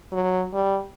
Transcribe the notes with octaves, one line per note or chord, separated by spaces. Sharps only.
F#3
G3